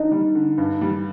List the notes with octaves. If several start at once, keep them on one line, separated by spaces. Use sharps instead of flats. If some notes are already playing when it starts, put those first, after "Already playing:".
Already playing: D3 D4 D#4
G3
D3
G2
G3